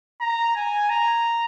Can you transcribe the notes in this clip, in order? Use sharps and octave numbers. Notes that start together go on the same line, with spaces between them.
A#5
G#5
A#5